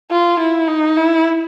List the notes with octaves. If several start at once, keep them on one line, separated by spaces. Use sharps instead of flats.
F4
E4
D#4
E4